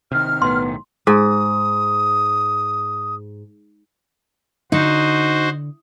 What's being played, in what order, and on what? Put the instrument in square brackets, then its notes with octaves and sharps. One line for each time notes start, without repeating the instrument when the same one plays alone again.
[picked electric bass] C3 D#3 [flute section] F6
[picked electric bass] B1 A2 D#3 [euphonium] B3 [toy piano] C6
[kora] G#2 [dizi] D#6
[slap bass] D3 [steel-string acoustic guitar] D#4 [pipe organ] F#4 C5